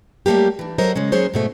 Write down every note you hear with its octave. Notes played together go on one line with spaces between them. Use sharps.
F#3 G3 A3 A#3 G4
E3 D4
F#3 A4 A#4 C5 D#5
C#3 G#3 C#4
F#3 A#3 C#4 G#4 C5 C#5
G#2 B2 A3